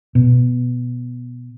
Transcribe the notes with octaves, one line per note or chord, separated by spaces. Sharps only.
B2